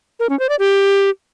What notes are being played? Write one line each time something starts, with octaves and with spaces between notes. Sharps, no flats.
A#4
C#4
C5
D5
G4